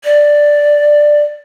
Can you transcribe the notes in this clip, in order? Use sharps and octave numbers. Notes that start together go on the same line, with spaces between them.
D5